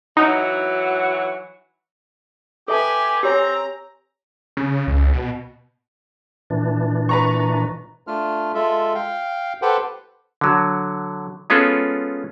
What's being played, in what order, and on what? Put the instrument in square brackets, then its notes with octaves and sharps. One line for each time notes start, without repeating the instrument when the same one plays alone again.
[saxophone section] E3 F#3 F#4 [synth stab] D#4
[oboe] G4 [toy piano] A4 E5 A5 [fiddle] B4 G#5
[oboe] C4 [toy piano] G4 C#5 G#5 [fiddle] A#5
[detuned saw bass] C#3
C#2
B2
[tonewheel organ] A#2 E3 D4
[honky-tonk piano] B4 A#5 C#6
[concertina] A3 D4 F4 F6
G#3 F4 A4 E5
F5 G5
G4 A4 B4 C5 F#5 G5
[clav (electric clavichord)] D3 F#3
G#3 B3 C#4 F4 G#4 A4